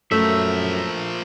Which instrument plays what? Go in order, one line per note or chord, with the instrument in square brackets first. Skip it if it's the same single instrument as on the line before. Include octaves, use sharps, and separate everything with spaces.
[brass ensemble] F#2 [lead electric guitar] F3 A#4 [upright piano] A3 [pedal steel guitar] E5